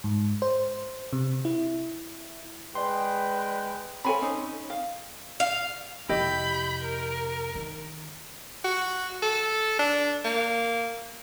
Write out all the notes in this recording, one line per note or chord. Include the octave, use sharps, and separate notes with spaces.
G#2
C5
C3
E4
G#3 B4 D5 G5 C6
C4 A4 C#5 F5 G#5 B5
C4 C#4 D#4
F5
F5
F2 C3 E4 G4 D#5 B5 G6
A#4
D#3
F#4
A4
D4
A#3